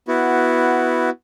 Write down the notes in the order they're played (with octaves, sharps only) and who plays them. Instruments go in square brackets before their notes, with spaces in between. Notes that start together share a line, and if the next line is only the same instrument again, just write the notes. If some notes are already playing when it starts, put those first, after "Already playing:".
[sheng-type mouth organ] B3 E4 F#4